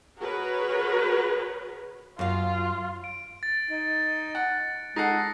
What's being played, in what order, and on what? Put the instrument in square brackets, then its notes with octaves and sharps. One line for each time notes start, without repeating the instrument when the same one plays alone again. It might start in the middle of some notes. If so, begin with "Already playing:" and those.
[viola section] F#4 G#4 A#4 B4 C#5
[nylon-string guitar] F#2 F5 [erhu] F4
[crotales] D7
A6
[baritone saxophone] D#4
[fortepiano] F#5
[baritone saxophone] G#3 [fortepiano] D#4 A4 F#5 [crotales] A#6 C7